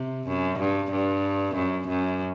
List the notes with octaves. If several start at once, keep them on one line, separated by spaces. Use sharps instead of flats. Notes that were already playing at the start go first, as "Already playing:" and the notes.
Already playing: C3
F#2
G2
G2
F#2
F#2